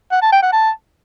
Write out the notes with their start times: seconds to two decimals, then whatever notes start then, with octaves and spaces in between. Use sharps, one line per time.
0.12 F#5
0.22 A5
0.32 G5
0.42 F#5
0.53 A5